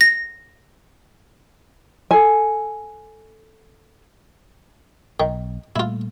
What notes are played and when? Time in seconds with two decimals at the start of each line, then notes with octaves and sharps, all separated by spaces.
0.01 A#6
2.11 A4 G#5
5.20 B1 D#3
5.76 A#2 G3 A3 E4 F4